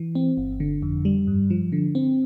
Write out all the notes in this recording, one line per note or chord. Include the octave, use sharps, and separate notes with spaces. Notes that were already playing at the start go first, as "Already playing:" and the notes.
Already playing: E3
C4
G1
D3
F2
G3
G2
F3
D3
C4